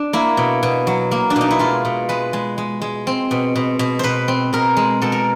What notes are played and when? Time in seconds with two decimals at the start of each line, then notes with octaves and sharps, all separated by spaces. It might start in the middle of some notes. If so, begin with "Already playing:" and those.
Already playing: D4
0.13 A#3 E4
0.37 B2
0.63 B2
0.87 F#3
1.11 A#3
1.30 D4
1.36 B2 D#4
1.51 E4
1.59 G#3 F4
1.85 B2
2.09 G#3 B4
2.33 G#3
2.58 G#3
2.82 G#3
3.07 C4
3.31 B2
3.55 B2
3.79 B2
3.99 B2 B4 C5
4.28 C4
4.53 B2 A#4
4.77 G#3
5.02 B2 A4
5.12 A#4